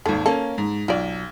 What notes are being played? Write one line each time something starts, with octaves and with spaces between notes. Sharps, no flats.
G#1 D#2 A4
A#3 C#4 A4
G#2
B1 F4 D5